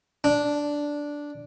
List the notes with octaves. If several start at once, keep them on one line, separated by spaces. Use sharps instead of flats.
D4